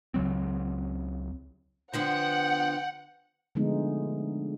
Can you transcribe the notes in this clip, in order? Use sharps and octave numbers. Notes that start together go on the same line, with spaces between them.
C#2 C#3 F#3 C4
D3 F3 B3 F#5 G5
D3 F3 G#3 A3 B3 D#4